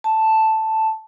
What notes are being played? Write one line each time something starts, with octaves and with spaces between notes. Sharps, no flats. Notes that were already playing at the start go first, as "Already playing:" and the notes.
A5